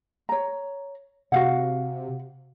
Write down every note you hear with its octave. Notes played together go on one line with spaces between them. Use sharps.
C#5 A#5
C3 F#4 F5 F#5